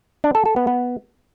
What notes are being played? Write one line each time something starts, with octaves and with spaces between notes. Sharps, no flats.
D4
A4
A4
B3
B3